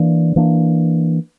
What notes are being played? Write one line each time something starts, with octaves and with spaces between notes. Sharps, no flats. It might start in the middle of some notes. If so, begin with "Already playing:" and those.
Already playing: E3 A#3 D4
E3 A#3 D4